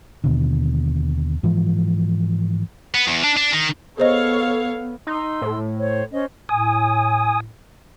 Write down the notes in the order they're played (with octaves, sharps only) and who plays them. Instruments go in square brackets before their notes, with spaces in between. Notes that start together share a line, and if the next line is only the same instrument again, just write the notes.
[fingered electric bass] D#2 B2 D3
G#2 E3 F3
[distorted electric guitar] B3
E2
D4
D4
D#3
[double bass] B3 [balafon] G#4 C5 D#5 [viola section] A4 C#5 F5
[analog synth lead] D#4 [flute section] C6 E6
[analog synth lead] A2
[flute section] C5 C#5
C#4 C5 D#5
[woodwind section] A2 [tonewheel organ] G#5 D#6